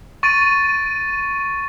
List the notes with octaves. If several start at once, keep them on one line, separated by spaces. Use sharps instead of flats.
C#6 A6 D7 D#7